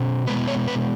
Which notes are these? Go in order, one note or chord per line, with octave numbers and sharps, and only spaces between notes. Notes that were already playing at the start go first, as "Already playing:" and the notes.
Already playing: B2 C#4
B2 G#3 B3 B4
C#5
B4